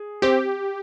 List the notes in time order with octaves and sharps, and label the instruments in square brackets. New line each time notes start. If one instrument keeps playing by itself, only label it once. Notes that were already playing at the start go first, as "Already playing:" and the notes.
Already playing: [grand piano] G#4
[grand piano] C4 [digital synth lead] G4